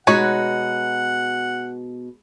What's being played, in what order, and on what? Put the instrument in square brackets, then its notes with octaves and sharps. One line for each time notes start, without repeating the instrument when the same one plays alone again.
[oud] B2 [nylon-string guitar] G#3 F#4 [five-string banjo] D#4 B4 C#5 [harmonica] F#5